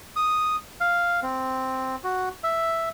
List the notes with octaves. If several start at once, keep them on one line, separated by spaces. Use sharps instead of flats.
D#6
F5
C4
F#4
E5